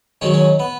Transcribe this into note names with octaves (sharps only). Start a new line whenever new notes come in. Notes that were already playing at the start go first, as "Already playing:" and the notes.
G#2 D#3 F#3 C#4
C#4
B3